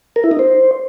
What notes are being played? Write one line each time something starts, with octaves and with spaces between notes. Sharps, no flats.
A#4
E4
D#4
C5